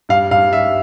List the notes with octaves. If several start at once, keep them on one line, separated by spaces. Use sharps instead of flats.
G2 F5
G2 F5
G3 E5